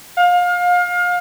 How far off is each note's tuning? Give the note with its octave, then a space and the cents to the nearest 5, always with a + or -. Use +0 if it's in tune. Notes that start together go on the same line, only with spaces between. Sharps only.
F5 +30